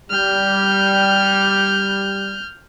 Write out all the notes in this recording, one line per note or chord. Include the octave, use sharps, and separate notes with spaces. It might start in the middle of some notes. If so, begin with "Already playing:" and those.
G3 F6 G6